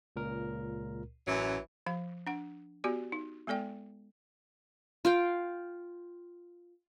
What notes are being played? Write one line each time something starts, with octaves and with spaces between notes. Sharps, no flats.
C#2 A#2 A#4
A1 F#2 E3 F#3
F3 F5
D4 F#5
B3 F#4 G4 D5
D#4
G#3 B3 A4 D5 G5
F4 F5 G5